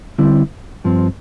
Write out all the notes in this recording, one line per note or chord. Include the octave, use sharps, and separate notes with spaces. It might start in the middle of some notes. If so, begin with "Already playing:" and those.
D3 G3 C4 E4
G2 F3 C4